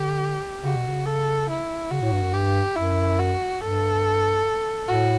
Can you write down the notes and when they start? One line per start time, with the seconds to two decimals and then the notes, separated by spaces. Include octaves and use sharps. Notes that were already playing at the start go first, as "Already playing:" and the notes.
Already playing: D3 G4
0.64 C#3 F#4
0.76 B2
0.88 C#3
1.06 A4
1.49 E4
1.90 C#3 F#4
2.02 A2
2.12 G2
2.23 F#2
2.33 G2 G4
2.76 F#2 E4
3.19 F#4
3.60 G2 A4
4.88 A2 F#4